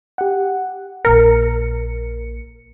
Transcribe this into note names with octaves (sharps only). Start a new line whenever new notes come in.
G4 F#5
A#1 A#2 A#4 C#7